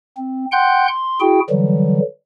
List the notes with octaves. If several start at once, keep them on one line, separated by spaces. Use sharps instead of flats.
C4
F#5 G5 C6 F#6 G6
C6
E4 F#4 G#4 G5
D3 E3 F#3 G3